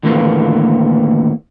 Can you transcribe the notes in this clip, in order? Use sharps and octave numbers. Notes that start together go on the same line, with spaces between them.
D#2 A2 D3 E3 A#3 B3